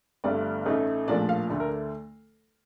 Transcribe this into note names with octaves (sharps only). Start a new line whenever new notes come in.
G1 G2 D3 A3 D5
A1 A2 A3 D#4
A#1 A2 F3 A#3 D4 D5
F5
D2 D3 A3 D4
A#4